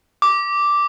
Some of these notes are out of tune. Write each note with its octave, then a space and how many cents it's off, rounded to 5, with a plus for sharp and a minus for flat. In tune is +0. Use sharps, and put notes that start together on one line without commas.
D6 -5